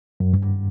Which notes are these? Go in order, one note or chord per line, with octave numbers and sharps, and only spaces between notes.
F#2
G2